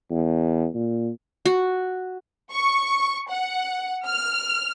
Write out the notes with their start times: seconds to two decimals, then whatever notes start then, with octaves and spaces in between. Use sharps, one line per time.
0.10 E2
0.74 A#2
1.45 F#4
2.52 C#6
3.29 F#5
4.06 F6